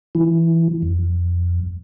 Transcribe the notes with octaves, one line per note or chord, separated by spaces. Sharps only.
E3
F2